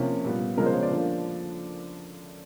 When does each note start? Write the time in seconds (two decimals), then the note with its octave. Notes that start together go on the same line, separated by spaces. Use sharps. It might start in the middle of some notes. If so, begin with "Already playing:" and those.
Already playing: C3 F3 A#3 C#4
0.24 A#2 G3 B3
0.57 C#3 F3 G#3 B3 A#4
0.66 C5
0.74 C#5
0.83 D5
0.91 D3 F3 A#3